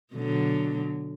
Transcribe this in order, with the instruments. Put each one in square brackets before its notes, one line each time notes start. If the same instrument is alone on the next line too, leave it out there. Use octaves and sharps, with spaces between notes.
[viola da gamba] B2 D3 F#3